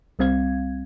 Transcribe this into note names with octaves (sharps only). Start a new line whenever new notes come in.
C2 G3 C4 F5 G#6